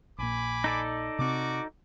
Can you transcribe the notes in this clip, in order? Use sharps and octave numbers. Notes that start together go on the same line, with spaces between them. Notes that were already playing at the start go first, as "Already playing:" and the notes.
A#1 A#2 G#5 B5 D6
D#4 A4 D5
C3 C4 F#4 D6